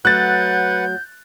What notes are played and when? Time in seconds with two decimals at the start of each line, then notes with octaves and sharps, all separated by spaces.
0.05 F#3 A3 B4 F#5 F#6 G6 A6